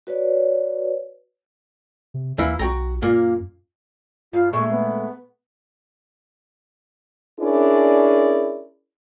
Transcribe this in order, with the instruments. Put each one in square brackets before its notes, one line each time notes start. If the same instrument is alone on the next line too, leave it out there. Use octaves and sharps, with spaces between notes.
[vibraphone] F#4 B4 C#5 D5
[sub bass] C3
[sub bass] D#2 [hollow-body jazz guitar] E3 A#3 E4
[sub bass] B1 [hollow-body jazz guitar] F#4 G5 A#5
[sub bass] F#2 [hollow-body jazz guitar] A#2 A#3
[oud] G2 F5 [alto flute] F4
[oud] A#2 G#3 A3 [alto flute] C#6
[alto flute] B3
[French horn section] C#4 D4 E4 G#4 A#4 D5